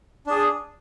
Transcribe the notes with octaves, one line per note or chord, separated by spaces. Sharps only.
D4 G#4